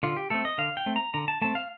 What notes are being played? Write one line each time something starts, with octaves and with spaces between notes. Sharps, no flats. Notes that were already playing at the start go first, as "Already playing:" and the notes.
D3 F4
G4
A3 C4 A4
D#5
D3 F5
G5
A3 C4
A#5
D3 A#5
A5
A3 C4 A5
F5